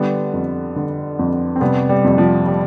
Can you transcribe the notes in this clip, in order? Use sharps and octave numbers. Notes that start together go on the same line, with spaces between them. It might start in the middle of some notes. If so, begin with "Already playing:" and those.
Already playing: D3 G3 B3
F2
D3
F2
C4
C3 G3 B3
G3
F2 G3
F3
G3